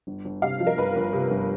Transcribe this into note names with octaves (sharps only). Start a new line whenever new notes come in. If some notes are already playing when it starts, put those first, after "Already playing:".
G1
G1
C3 F5
F3
A#4
G1 B4
G1
C3
G1